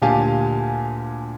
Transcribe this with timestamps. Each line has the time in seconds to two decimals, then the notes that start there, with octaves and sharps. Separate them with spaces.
0.02 D2 A#2 G4 F5 G#5 A5